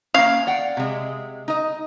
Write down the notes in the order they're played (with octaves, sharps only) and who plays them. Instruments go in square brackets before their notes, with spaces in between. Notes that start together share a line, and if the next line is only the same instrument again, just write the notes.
[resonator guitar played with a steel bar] A#3 C#4 [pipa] F5
[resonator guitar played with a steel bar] D5 F#5 G5
C3 G#3
D#4 D#5